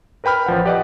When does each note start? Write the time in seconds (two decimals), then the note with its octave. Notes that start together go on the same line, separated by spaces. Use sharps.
0.24 A#4 B4 G5 B5 F6
0.46 A1 F3 F#5
0.66 G4 B4 D5 D#5 F#5